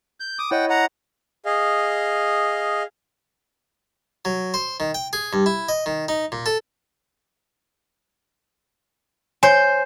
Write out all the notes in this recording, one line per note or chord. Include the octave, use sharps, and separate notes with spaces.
G6
D6 D#6
E4 C#5 D#5 F#5 G5
F#5 A#5
G#4 D#5 F5
F#3
C5
D#3
G5
G#4
G2
E4
D#5
D#3
D#4
A#2
A4
C5 C#5 G#5